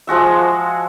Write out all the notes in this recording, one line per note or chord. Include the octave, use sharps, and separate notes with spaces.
F3 G#3 F#4 E5